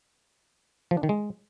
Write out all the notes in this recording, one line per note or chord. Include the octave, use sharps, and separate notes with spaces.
F3
D4
D#3
G#3